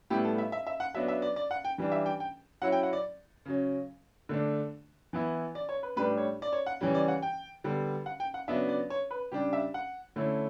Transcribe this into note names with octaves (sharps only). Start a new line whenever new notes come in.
A2 G3 B3 E4 G4
A4
E5
E5
E5
F#5
F#3 B3 D4 E5
E5
D5
D5
F#5
G5
E3 G3 D4
E5
G5
G5
F#3 C#4 E4 F#5
G5
F#5
D5
C#3 F#3 C#4
D3 A3 D4
E3 B3 E4
D5
C#5
B4
A2 G3 D4 B4
C#5
D5
C#5
F#5
C#3 E3 G3 C#4
D5
F#5
G5
D3 G3 B3
F#5
G5
F#5
C#3 F#3 B3 D4 E5
D5
C#5
B4
C#3 G3 D4 G4
E5
F#5
D3 A3 C#4 E4